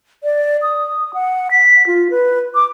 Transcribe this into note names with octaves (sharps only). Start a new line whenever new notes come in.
D5
D#6
F#5
B6
F4
B4
D6